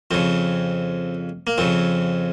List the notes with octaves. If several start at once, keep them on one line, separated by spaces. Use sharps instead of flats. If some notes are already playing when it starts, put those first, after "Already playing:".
F2 C#3 C4
A#3
F2 C#3 C4